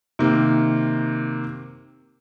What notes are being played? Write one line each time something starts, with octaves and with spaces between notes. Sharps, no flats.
C3 D#3 A#3